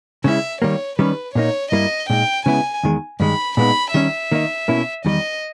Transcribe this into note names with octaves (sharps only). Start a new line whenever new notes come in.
C#3 G#3 C#4 E4 E5
D#3 G3 A#3 C#5
D#3 G3 C#4 B4
A#2 A#3 D#4 C#5
G2 G3 A#3 E4 D#5
A#2 G#3 D#4 G5
C#3 G#3 B3 E4 G#5
E2 D#3 G#3
G2 D#3 G#3 B5
A#2 G#3 B3 D#4 B5
D#3 G3 C#4 E5
D#3 A#3 D#4
B2 A#3 C#4 E4
E2 D#3 G3 D#5